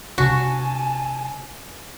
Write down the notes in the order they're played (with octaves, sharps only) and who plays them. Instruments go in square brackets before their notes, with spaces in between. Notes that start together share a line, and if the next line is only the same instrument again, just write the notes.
[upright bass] C3 D4 [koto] F#4 [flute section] G#5 A5